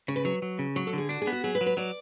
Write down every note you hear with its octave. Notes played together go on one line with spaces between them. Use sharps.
C#3 C#5
B4
F#3 C#5
F#3
C#3
F#3 C#5
A4
D3 G#4
D4 F#4
G#4
B3
F#4
F#3 G#4
B4
F#3
B4
F#3 D5